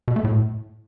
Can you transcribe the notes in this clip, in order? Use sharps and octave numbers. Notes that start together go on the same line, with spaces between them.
B2
A3
A2